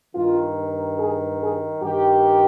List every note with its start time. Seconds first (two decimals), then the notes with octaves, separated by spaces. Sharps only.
0.13 G2 D#3 F4
0.98 G#4
1.40 G#4
1.82 G2 D#3 G4